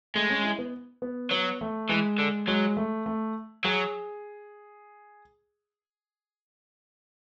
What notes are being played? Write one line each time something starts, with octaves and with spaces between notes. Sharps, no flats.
G#3 A3
C#4
E4
B3
B3
F#3 B3
A3
E3 G#3
D3
F#3 G#3
A3
A3
F#3 G#4